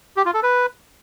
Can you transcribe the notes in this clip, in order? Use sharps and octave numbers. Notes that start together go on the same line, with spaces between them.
G4
F4
A4
B4